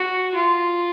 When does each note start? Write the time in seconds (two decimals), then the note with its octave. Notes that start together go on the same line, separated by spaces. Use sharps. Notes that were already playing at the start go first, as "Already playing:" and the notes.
Already playing: F#4
0.34 F4